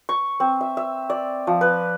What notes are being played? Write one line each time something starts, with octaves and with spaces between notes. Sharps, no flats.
C#6
C4
E5
E5
D5
F3
B4